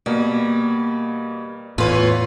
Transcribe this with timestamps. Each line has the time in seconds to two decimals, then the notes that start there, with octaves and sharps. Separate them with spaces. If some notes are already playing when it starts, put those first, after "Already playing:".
0.06 B2 G3 A#3
1.78 E2 A2 F4 B4 C#5